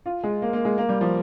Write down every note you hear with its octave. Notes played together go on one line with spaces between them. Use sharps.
F4
G#3
A#3
A#3
G#3
A#3
G3
F3